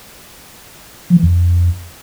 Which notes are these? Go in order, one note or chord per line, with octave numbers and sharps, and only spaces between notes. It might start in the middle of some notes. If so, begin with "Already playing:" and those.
F3
E3
F2